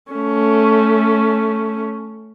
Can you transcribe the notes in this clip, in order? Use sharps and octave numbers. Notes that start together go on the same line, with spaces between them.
A3 C#4